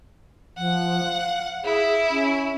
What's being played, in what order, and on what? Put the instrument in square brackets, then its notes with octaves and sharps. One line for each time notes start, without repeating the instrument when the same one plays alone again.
[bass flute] F3 [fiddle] F#5
[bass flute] F5
[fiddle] E4 [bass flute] G#4
[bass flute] C#4